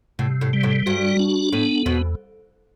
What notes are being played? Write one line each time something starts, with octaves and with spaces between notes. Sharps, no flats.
A2 C3
A2
G3
A2
G2 F#4
D4
A2 B3
E2 B2